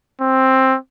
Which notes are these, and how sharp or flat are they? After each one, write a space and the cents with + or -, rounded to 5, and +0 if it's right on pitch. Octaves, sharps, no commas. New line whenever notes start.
C4 +10